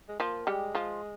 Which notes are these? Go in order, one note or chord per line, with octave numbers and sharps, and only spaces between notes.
G#3
F3 A#3 F4
G3 G#3 G4
F3 F4